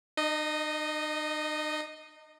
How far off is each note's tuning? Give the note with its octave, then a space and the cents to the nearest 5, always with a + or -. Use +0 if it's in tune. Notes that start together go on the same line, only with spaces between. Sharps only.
D#4 -40 D#5 +0